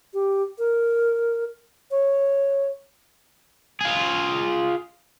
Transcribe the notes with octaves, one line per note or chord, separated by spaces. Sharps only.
G4
A#4
C#5
F4 G#4